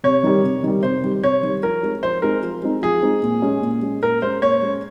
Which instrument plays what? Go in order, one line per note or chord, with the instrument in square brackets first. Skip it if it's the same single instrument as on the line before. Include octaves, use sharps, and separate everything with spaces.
[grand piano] C3 [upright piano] C#5
[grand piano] D#3 G3
C3
D#3 G3
[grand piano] C3 [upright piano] C5
[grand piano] D#3 G3
[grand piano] C3 [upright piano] C#5
[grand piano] D#3 G3
[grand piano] F3 [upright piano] A#4
[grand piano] G#3 C4 D#4
[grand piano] F3 [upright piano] C5
[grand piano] G#3 C4 D#4 [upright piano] A#4
[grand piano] F3
G#3 C4 D#4
[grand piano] F3 [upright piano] G#4
[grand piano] G#3 C4 D#4
A#2
G#3 C#4
A#2
G#3 C#4
[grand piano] A#2 [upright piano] A#4
[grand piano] G#3 C#4 [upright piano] C5
[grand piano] A#2 [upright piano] C#5
[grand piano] G#3 C#4